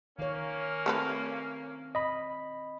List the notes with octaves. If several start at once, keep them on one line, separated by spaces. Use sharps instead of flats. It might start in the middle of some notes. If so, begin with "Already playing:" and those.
D#3 A#3 C#4 C#5
A3 C4 A4 B4
D#5 B5